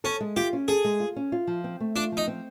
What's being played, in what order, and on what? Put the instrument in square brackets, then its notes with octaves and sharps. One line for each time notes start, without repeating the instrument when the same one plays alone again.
[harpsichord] C#4 [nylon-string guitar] A4
[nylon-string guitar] G#3
[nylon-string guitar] F4 [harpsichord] G4
[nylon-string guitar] C#4
[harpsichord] G#4 [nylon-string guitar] A4
[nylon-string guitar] G#3
F4
C#4
F4
F3
C4
A3
[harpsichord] D4 [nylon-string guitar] F4
[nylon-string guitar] F3
[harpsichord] D#4
[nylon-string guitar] C4